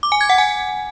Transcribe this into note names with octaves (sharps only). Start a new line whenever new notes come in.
D6
G#5
G#6
F#5
G#5